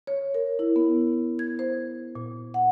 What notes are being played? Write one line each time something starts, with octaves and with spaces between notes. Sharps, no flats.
C#5
A#4
E4
B3
G#6
C5
A#2
F#5